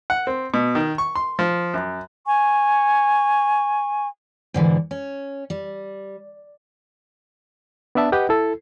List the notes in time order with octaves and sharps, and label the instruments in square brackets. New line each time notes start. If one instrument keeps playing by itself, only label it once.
[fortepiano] F#5
C4
B2
D#3
C#6
C6
F3
F#2
[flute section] G#5 C#6
[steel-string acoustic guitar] G#2 D3 E3 G3
C#4
G3
[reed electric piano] B3 D4 D5 E5 A5
G4 B4 D#5 F#5 G5
E4 A4